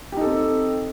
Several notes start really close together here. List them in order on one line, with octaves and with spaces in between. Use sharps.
G4 D#4 A4 C4